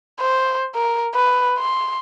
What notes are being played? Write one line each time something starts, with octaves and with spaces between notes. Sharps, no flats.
C5
A#4
B4
C6